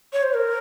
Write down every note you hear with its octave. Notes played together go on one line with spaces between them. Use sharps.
C#5
C5
A#4